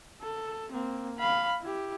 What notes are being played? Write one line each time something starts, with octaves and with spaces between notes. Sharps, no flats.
A4
A#3 C4
F5 B5
E4 G4